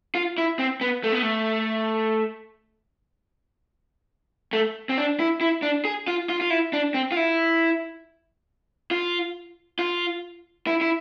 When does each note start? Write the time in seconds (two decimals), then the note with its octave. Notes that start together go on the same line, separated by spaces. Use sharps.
0.15 F4
0.38 E4
0.59 C4
0.81 B3
1.04 A3
1.12 B3
1.22 A3
4.53 A3
4.89 C4
4.98 D4
5.20 E4
5.41 E4
5.63 D4
5.85 G#4
6.08 F4
6.29 F4
6.41 F4
6.50 E4
6.73 D4
6.94 C4
7.12 F4
7.17 E4
8.91 F4
9.79 F4
10.67 E4
10.81 E4